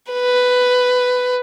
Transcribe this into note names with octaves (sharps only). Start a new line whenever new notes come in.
B4